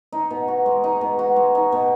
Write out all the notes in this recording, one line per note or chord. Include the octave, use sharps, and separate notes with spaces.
D#4
B2
F#4
G#3
D#4
B2
F#4
G#3
D#4
B2